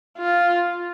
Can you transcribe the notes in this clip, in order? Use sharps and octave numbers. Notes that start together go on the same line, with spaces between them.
F4